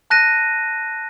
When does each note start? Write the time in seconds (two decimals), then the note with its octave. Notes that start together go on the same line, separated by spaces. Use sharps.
0.10 A5 F#6 A#6 D#7